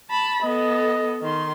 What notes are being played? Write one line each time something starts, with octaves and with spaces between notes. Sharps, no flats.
A5 B5
B3 A4 D#5
D#3 C6